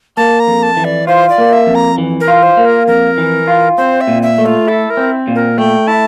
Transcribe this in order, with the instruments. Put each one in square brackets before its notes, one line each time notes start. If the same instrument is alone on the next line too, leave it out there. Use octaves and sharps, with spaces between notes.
[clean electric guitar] A#3 [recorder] A5
[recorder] A#5
[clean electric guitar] F2
[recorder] A5
[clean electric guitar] E3
[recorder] D5
[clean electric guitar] F4 [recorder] C5
[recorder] D5
[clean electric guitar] A#3
[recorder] E5
[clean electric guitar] F2
[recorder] A#5
[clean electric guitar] E3
[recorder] A#4
[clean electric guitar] F4
[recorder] C5
[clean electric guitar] A#3
[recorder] A#4
[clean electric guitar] F2 [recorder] A#4
[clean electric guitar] E3
F4
[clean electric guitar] C4 [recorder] C5
[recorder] E5
[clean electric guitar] A#2
[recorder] E5
[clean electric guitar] A3
[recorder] F4
[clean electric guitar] E4 [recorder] A4
[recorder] A#4
[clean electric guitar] C4
A#2
[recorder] A#4
[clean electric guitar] A3 [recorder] G5
[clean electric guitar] E4 [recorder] A5